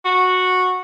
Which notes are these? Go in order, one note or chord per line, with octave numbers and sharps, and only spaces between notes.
F#4